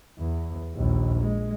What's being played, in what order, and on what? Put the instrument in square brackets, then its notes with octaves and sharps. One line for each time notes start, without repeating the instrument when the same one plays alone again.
[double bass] E2
A#1 D#2
G#3